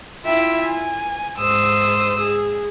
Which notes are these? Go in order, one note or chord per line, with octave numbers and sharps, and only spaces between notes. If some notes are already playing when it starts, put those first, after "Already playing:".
E4 F4 E5 G5
G#5
G#2 C5 D#6 E6
G#4